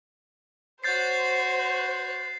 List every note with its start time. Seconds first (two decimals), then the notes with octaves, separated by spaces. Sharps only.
0.84 F#4 C5 C#5 G6 A6 C7